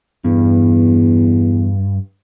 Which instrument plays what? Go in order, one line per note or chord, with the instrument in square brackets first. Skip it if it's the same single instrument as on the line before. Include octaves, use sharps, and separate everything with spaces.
[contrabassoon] E2 [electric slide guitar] G2